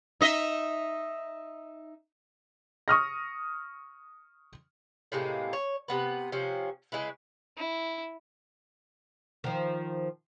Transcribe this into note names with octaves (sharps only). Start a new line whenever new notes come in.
D#4 D#5 E5
C#6 D#6 F6 A#6
A2 C3 G#3 A#3
C#5
C3 B3 B4
C3 F3 C#4
C#3 G#3 E4 B4
E4
D#3 F3